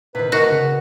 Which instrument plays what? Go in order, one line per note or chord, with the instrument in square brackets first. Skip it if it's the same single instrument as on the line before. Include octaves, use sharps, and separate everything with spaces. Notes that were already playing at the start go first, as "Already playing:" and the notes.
[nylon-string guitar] C3 D#3 [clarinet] B4
[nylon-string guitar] D2 A#4 D#5 [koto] F#4
[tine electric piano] C#3